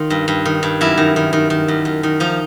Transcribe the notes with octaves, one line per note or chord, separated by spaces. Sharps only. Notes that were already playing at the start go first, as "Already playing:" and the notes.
Already playing: D#3 F4
G2
G2
D#3
G2
F#2 E4
D#3
D#3
D#3
D#3
F#2
F#2
D#3
F3 D#4